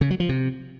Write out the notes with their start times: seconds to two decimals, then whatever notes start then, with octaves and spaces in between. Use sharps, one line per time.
0.01 C#3
0.10 F#3
0.20 F3
0.29 C3